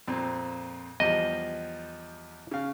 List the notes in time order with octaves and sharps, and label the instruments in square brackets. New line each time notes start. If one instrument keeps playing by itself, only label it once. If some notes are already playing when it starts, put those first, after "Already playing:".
[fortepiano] F2 A#2 C4
[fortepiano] E2 F3 G3 [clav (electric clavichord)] D#5
[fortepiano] C#3 F5